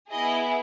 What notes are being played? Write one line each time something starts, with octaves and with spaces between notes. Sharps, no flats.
B3 E4 G#4 D#5